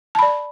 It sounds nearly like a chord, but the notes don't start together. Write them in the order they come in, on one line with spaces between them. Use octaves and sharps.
A5 B5 D5